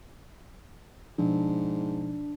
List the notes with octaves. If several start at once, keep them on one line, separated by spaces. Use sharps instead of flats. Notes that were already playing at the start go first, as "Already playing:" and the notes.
G#2 B2 F3 D4